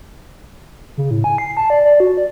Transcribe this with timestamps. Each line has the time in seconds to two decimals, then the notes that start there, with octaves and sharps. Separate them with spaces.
0.97 C#3
1.11 A2
1.24 G#5
1.38 C7
1.57 A5
1.70 D5
1.85 D5
2.00 F#4
2.17 D5